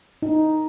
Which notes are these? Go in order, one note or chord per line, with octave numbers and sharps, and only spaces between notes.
D#4